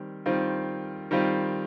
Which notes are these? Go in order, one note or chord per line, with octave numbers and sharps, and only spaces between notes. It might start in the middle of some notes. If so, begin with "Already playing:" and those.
Already playing: D#3 G3 C4
D#3 G3 C4 F4
D#3 G3 C4 F4